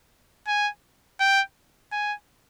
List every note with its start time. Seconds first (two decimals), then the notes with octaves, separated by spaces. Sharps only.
0.47 G#5
1.20 G5
1.92 G#5